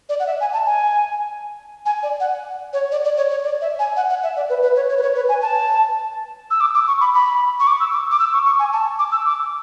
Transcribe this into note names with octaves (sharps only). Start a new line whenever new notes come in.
D5
F#5
E5
G#5
A5
G#5
G#5
D5
F#5
C#5
D5
D5
C#5
C#5
D5
E5
G#5
F#5
F#5
E5
D5
B4
B4
C#5
C#5
B4
C#5
B4
G#5
A5
E6
D6
D6
C#6
B5
B5
C#6
D6
E6
D6
D6
E6
C#6
C#6
G#5
A5
D6
E6
D6